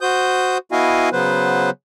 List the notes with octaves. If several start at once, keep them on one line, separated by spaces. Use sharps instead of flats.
F#4 C5 D#6 G6
B3 E4 F#4 D#5 F5 G#5
C#3 F#3 B3 B4 C5